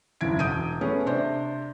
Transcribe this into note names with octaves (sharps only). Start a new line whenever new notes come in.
F#1 D#2 E4 G#6 D7
E1 D#6 G6 D7 D#7
A3 B3 C#4 G#4
C3 D4 C5 C6